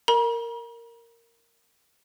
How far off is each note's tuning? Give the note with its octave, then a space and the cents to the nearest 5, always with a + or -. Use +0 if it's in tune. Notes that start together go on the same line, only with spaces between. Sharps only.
A#4 -10 A#5 +45